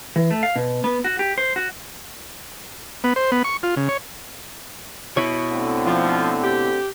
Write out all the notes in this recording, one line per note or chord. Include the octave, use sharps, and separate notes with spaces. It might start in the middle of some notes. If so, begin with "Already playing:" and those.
E3
A3
F5
B2
B3
F#4
G4
C5
F#4
B3
C5
B3
C#6
F4
C#3
C#5
B2 E4 C#5
D3 A3 C4
F3
G4